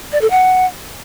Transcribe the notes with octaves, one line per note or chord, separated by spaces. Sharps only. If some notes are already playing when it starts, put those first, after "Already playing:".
D5
A4
F#5